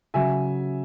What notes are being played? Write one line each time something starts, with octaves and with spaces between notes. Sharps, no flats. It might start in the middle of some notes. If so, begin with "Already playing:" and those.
C#3 F#3 E5 G#5